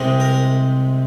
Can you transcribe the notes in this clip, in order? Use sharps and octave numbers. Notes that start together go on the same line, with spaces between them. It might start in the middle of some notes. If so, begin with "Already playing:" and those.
Already playing: C2 C3 G#3 C4
A#4